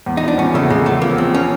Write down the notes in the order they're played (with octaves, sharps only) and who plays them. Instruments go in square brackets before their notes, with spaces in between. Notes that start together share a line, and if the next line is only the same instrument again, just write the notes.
[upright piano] E2
[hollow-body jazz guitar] D#4
[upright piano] F3
[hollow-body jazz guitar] D4
[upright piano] E2 [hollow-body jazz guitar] C#4
[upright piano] C#3 [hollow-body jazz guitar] A3
[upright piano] C#3 [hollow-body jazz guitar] G#3
[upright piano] E2 [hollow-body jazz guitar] A3
[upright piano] F3 [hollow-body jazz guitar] A#3
[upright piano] F3 [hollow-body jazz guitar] C4
[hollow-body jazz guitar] C#4